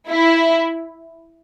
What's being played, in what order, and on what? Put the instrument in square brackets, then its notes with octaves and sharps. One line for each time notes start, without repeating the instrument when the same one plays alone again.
[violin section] E4